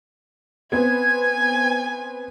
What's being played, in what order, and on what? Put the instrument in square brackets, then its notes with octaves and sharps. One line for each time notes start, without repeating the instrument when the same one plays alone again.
[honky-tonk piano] B3 C4 [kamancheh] G#5 [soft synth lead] G#6